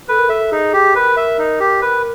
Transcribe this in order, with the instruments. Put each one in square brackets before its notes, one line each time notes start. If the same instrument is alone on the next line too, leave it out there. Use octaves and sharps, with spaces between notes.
[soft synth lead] A4 [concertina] B4
[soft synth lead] A#4
[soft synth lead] A4 [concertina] E5
[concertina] D#4 [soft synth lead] G#4
[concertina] G4
[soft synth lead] A#4 [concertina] B4
[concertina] E5
D#4
G4
B4